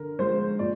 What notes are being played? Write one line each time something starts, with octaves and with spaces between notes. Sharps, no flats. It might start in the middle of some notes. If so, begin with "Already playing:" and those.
Already playing: D3 A#4
F3 G#3 C5
A#2 D5